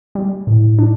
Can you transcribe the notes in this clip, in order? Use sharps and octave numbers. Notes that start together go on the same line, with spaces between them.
G3
A2
D4